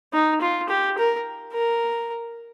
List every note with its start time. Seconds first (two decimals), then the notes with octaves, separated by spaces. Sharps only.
0.14 D#4
0.41 F4
0.69 G4
0.98 A#4
1.53 A#4